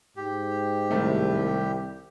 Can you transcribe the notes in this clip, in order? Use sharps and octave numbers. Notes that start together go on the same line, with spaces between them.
G#2 G4
C2 A2 D#3 A3